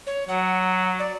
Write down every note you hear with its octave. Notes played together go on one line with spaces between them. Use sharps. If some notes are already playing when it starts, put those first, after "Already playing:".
C#5
F#3 F#5
D5